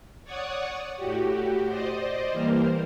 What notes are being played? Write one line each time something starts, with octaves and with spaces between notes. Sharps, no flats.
C#5 D5 F#5 C#6 D#6
A2 F#4 G4
C5 D5 D#5
E3 G3 A#3 A#4 C5